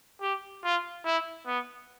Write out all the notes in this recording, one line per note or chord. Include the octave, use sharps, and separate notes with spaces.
G4
F4
E4
B3